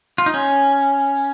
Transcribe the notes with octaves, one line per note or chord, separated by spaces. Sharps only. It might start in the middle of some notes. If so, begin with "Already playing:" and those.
F4
D#4
C#4